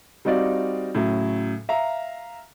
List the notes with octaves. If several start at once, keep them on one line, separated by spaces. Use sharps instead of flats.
G3 C4 D#4 F#4 D5 F5
A2 C#3 F#3
E5 F5 A#5